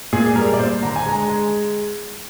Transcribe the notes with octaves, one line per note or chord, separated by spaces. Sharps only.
A#2 G#4
G#4
G3 A#4
D5
A#2 C5
D3 A#5
G#5
G#3 A#5
G#3